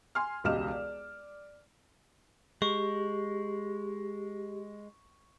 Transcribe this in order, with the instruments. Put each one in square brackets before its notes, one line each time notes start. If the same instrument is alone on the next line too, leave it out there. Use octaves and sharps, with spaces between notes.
[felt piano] G#5 C6 F6
E1 C#2 G4 D#5 F6 E7
D5
[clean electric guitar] G#3 [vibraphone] G4 [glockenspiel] C#6